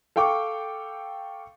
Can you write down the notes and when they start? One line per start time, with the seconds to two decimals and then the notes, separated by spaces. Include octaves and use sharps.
0.16 A4 F5 G5 C#6 D6